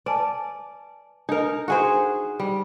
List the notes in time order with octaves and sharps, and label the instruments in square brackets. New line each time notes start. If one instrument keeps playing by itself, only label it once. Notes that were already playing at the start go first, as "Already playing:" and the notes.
[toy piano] B4 G#5 A5 [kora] D5
[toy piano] D4 B4 [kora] D#4 A#4
[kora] F#4 G#4 C5
G3